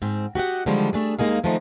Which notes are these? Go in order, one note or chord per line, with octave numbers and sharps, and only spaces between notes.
G#2 C4
F#4 G4 D#5 F#5
D3 D#3 F3 G3 G#3
A3 D4 G#4
D#2 G#3 A#3 D#4 G#4 F5
D#3 F3 G#3 A3 C4 D#4